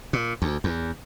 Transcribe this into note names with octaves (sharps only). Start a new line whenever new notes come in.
A#2
D2
E2